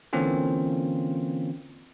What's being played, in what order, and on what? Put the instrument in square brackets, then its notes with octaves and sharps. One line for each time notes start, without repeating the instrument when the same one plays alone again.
[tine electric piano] D3 E3 A#3 C4 C#4 F4